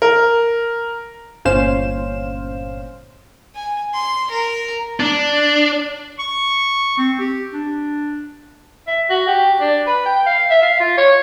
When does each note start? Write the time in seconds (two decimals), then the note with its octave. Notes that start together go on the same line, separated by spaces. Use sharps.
0.02 A#4
1.45 G1 A#2 C#4 C5 F5 E7
3.55 G#5
3.94 C6
4.31 A#4
5.00 D4
6.19 C#6
6.98 C4
7.19 G4
7.53 D4
8.87 E5
9.10 F#4
9.27 G4
9.60 D4
9.87 B4
10.06 G5
10.26 F5
10.50 E5
10.62 F5
10.80 F4
10.97 C#5